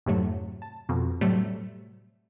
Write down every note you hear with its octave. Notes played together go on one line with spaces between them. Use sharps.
F2 G#2 C3 F#3 A3
A5
F2 B2
A2 C3 F#3 G3 A3